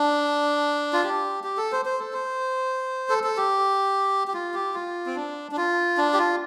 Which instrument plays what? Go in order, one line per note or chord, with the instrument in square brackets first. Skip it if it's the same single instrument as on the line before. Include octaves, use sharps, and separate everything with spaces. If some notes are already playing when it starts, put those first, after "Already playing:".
Already playing: [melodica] D4
F4
G4
G4
A4
C5
C5
A4
C5
A4
A4
G4
G4
F4
G4
F4
C4
D4
D4
F4
D4
G4
F4